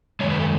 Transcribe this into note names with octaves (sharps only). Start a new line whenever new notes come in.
F#2 D#3 G#3 C#5
B4
A4